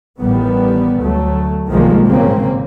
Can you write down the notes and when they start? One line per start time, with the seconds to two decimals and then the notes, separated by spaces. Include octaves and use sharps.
0.20 A1 D#3 G3 B3
1.01 D2 F#3 A3
1.69 B1 D#3 F3 G3 G#3 A#3
2.08 A1 G#2 C#3 A#3 C4